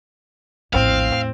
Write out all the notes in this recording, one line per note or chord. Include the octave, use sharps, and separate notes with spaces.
A#1 E2 A2 C4 F5